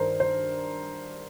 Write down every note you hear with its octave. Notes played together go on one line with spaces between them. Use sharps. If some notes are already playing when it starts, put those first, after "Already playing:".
Already playing: G2 D#3 A#4 C5
C5